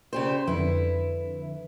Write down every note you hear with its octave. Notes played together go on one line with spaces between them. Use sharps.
C#3 G4 C5
F2 D3 E4 B4